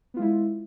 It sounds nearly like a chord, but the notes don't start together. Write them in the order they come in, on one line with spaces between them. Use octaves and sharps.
B3 F4 G#3 E4